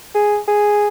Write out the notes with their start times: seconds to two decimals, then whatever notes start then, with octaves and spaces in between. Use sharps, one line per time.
0.15 G#4
0.48 G#4